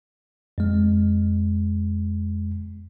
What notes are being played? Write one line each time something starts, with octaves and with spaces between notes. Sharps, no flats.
F2 G#3